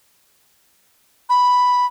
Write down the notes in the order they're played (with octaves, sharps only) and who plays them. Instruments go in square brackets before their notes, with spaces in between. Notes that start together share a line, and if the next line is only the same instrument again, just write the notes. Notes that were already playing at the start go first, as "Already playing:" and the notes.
[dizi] B5